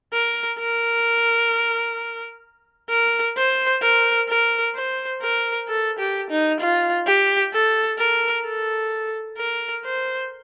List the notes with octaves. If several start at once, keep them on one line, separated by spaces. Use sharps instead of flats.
A#4
A#4
A#4
C5
A#4
A#4
C5
A#4
A4
G4
D#4
F4
G4
A4
A#4
A4
A#4
C5